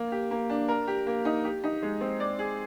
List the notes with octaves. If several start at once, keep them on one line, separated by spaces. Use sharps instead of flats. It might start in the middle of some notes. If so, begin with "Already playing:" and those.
Already playing: A#3
G4
A#3
D4
A#4
G4
A#3
D#4
G4
D#4
G#3
C4
D5
G#4